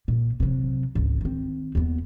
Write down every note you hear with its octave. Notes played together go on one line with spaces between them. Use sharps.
A#2
C3 F#3
G#1 C#2
D#3 C4
D#2 B3